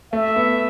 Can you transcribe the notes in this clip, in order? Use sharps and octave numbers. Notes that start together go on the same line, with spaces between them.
A3 E5
B3